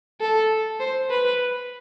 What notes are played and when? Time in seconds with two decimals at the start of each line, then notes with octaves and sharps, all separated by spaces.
0.21 A4
0.80 C5
1.10 B4